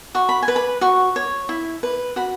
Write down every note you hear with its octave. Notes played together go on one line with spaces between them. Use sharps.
F#4 C#6
B5
G#5
B4
B5
F#4 C#6
C#5
E4
B4
F#4 B5